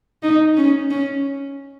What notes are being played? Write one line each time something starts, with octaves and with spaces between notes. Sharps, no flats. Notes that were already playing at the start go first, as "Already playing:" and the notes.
D#4
C#4
C#4